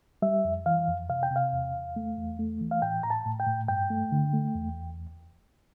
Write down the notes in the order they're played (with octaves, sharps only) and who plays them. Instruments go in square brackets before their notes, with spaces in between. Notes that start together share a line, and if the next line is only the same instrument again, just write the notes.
[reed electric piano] G3 E5
F2
E3 F5
F2
C3 F5
G5
C3
F5
E2
E2
A3
E2
A3
E3
F5
A2 G5
A2 A#5
A5
A2
G5
A2
G2 G5
A3
D3
A3
E2